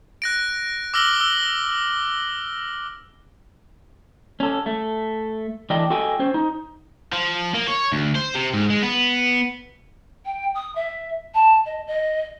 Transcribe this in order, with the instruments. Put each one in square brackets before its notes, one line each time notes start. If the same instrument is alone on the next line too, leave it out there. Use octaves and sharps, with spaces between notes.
[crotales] F#6 A#6 D7
D6 E6 F6 A#6 F#7 G7
E6 G7
[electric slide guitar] C#4 A4
A3
E3 A3 D4 D#5 G5
F#4 A4 D#5 G5 G#5
C#4 C5
D#4
[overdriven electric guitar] F3
A#3
C#5
D2
C5
C3
G#2
G#3
B3
[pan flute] G5
D#6
E5
A5
D#5
D#5